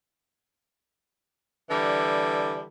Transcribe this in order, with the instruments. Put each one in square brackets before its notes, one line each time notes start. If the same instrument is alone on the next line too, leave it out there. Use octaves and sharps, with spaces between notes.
[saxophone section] D3 E3 G3